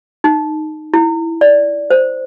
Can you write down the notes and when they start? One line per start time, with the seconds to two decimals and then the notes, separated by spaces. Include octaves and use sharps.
0.24 D#4
0.94 E4
1.41 D5
1.90 C5